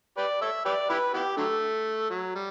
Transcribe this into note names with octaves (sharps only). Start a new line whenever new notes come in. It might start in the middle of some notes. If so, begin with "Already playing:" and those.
G4 B4 D5
A4 C#5 E5
G4 B4 D5
E4 G4 B4
B3 E4 G4
D3 F#3 A3
F#3
G3